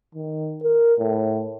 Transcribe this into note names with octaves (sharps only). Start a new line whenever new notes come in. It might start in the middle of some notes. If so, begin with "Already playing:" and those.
D#3
A#4
A2